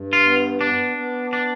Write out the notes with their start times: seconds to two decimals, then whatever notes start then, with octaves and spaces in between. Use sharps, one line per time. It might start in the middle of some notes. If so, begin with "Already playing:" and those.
Already playing: G2
0.13 F4
0.25 B3
0.61 B3 D4
0.97 B3
1.33 D4